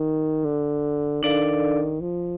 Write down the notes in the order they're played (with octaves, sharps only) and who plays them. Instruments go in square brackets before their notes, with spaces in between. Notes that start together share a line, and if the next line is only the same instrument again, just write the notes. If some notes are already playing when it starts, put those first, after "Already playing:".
Already playing: [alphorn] D#3
D3
[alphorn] D#3 [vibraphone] D4 A4 D5 F5
[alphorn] F3